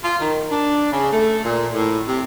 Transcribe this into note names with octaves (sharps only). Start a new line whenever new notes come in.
F4
D#3
D4
C#3
A3
A#2
A2
C3